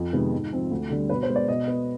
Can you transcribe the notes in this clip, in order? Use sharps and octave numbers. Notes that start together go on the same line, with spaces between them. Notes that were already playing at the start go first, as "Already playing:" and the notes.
Already playing: F2
C3 D#3 G#3 B3
G#2
F3 C4
D2
D3 G3
B2 B4
C5
G#3 B3
D5
B2 D#5
B3